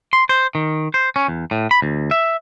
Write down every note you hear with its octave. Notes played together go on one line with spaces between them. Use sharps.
C6
C5
D#3
C5
C#4
E2
A2
B5
D2
E5